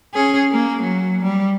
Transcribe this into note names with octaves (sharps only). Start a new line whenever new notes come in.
C#4 G#4
A#3
F#3
G3